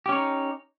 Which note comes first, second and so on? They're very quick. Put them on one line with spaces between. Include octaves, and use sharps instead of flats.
G4 C#4 C#5 D#4